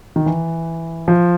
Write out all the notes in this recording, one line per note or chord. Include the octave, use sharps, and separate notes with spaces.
D#3
E3
F3